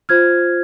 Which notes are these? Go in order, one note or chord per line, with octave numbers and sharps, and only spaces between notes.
F4 C5 F6 G#6